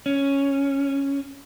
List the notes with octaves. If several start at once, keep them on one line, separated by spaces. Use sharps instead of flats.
C#4